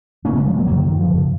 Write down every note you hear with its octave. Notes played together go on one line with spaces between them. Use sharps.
F#2 C#3 A#3 C#4
G#3 B3
F3 G#3
F#3 A#3
F#2 C#3 F#3 A#3
D#3
D#3
F3
F#2 C#3